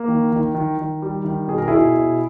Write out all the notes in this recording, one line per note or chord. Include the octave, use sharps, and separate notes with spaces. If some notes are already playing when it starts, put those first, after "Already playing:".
Already playing: A#3
D#3
D#3
D#3
D#3
G3
D#3
B2 G#4
A#4
B2 E4 G#4
B2